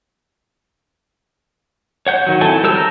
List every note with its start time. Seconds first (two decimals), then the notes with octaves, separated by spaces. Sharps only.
2.07 C#5 F#5 G6
2.27 D#3 F#3
2.41 C4 E4 A4 G5 G#5
2.63 G3 A#4 E6 G6
2.75 A#5 E6 F6